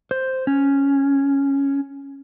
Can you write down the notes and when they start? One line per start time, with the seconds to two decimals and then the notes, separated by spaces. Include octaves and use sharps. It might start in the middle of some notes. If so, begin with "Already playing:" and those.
0.11 C5
0.47 C#4